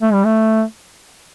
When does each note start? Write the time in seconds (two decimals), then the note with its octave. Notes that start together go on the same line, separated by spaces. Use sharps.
0.02 A3
0.13 G3
0.25 A3